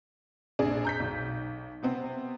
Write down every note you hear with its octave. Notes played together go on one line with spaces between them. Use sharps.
A#1 D4 G#4
A#5 G6 B6
B1
C3 B3 C4